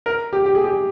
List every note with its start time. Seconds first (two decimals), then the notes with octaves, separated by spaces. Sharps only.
0.06 A#4
0.33 G4
0.46 G4
0.55 G#4
0.64 G4